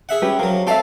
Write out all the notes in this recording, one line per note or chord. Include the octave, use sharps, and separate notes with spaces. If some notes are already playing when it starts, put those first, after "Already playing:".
G#4 E5 F#5
C#4 G4 B4
F3 F#3 A#4
C4 A4 D5 E5 F5